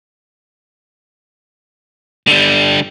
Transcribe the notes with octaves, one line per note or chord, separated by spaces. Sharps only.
D3 G3